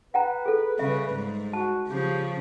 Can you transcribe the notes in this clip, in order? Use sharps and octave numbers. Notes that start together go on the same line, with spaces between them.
B4 F#5 G5 A#5
G#4 A4
C#3 G3 E5
G#2
F#4 A5
C#3 F3 G4